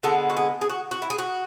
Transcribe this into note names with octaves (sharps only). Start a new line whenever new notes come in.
D3 G#3 B3 A4
F#4
G#4
G#4
F#4
F#4
E4
G#4
F#4